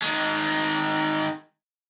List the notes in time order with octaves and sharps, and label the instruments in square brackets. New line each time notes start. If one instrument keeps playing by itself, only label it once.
[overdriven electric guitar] D#3 G#3